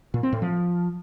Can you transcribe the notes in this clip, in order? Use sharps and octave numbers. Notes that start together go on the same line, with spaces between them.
A#2
C4
A2
F3